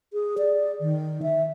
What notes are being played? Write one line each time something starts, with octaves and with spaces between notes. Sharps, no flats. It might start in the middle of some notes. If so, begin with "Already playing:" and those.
G#4
D5
D#3
E5